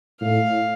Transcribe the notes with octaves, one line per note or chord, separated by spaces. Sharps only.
A2 F5